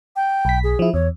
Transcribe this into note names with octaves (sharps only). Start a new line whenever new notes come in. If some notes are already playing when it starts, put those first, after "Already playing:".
G5
B1 B6
G#4
F3 E4
E2 C#5